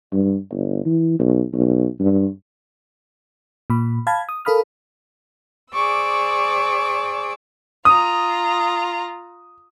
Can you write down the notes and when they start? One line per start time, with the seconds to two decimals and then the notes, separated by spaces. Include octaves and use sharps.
0.13 G2
0.52 G1
0.86 E3
1.20 B1
1.54 B1
2.00 G2
3.70 A#2 B5
4.07 F5 A5 B5 G#6
4.29 D#6
4.45 A4 A#4 F5 B5 D#6 F6
5.72 G#4 C5 D5 C#6 D6 E6
7.85 F4 A#5 D#6